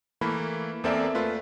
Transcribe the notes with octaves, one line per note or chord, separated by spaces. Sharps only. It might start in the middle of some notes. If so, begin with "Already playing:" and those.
E3 A3 A#3 B5
E2 A#3 C4 A4 D5 E5
A3 F4 B4